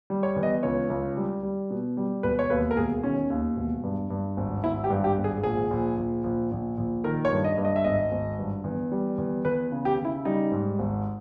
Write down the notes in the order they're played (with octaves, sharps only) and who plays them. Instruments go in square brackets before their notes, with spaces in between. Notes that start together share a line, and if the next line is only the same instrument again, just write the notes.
[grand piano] G3
C#5
E2
D#5
C#2 C#5
C#2
G3
G3
B2
G3
E1 B4
C#5
D#2 B4
A#4
E1 G#4
D#3 C#4
D#2
E1
G2
G2
G#1
G#1 E4
G4
G2
G4
G#1
G#4
A#1 G#4
A#1
A#1
A#1
A#1
A#1
D#3 A#4
C#5
G2
D#5
G2
D#5
E5
G#1 D#5
G#1
G2
E2
G3
E2
E2 B4
C#3
G4
C#3
E4
G3 D#4
G#2
G#1